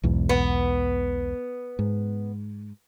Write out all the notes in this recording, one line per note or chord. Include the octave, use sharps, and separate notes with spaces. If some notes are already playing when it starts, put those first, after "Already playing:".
B1 E2 G#2
B3
G#2